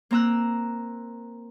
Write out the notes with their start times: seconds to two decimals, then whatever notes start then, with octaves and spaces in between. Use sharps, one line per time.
0.11 A#3 C4 A#5 E6 F#6